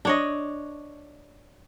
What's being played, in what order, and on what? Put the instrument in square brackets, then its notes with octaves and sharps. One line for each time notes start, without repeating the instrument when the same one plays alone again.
[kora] D4 C#5 D#5